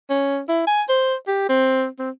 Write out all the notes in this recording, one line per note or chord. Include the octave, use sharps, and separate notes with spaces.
C#4
E4
G#5
C5
G4
C4
C4